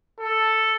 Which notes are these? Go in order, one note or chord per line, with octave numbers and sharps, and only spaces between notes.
A4